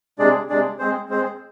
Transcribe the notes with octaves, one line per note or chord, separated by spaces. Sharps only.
C3 G#3 D4 G#4 D5
C3 G#3 D4 G#4 D5
G#3 C4 G#4 C5
G#3 C4 G#4 C5